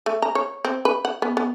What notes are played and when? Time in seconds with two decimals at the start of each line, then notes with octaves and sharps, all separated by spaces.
0.06 A3
0.22 A#5
0.35 C#5
0.65 C4
0.85 B4
1.05 F#5
1.22 B3
1.37 B3